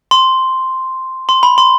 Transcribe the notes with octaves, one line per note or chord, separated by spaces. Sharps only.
C6
C6
B5
C6